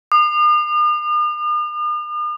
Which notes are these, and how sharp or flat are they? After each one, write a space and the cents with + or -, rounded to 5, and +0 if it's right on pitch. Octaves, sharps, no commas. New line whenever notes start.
D#6 -45